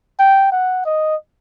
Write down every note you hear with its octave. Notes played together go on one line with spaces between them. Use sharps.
G5
F#5
D#5